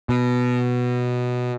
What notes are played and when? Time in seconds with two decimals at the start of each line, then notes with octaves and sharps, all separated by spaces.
0.09 B2